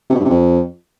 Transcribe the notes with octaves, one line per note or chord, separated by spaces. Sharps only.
C3
B2
G2
C3
F2